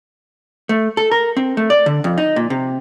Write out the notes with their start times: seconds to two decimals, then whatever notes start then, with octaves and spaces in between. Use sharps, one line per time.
0.69 A3
0.97 A4
1.11 A#4
1.37 C4
1.57 A3
1.70 D5
1.86 D3
2.04 F2
2.18 D#4
2.36 A#2
2.50 C3